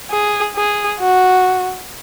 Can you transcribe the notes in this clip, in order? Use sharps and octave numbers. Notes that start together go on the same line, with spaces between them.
G#4
G#4
F#4